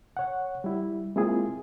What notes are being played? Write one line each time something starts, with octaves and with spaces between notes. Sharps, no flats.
C#5 F#5
G3 E4
G#3 A#3 C4 E4 F4 G#4